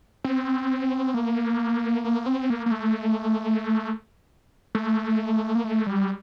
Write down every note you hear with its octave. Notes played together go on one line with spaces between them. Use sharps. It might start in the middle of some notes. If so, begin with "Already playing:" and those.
C4
A#3
A#3
C4
A#3
A#3
A3
A3
A#3
A3
G3